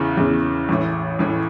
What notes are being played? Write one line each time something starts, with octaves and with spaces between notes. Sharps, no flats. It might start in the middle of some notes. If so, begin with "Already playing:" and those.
Already playing: E2 C#3 E3
E2 C#3 E3
A1 A2 E3
A1 A2 E3